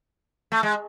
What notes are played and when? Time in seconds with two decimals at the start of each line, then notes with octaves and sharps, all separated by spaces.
0.52 A3
0.63 G#3